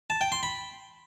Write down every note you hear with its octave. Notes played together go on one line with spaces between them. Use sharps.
A5
G5
C6
B5